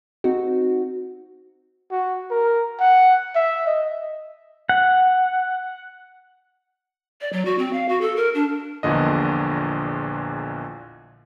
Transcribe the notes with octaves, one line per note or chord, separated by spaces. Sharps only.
C4 D#4 F#4
F#4
A#4
F#5
E5
D#5
F#5
D5
F#3
F#4
C4
F5
F#4
A4
A#4
D4
A#1 E2 A#2 D3 D#5